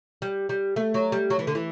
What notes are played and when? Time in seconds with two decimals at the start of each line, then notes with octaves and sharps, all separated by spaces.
0.22 G3
0.49 G3
0.76 A3
0.94 F#3
1.12 G3
1.30 F#3
1.39 E3
1.47 D3
1.55 E3